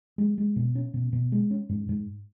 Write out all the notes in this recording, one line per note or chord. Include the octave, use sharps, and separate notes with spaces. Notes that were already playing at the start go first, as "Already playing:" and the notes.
G#3
G#3
B2
C#4
B2
B2
G#3
C#4
G#2
G#2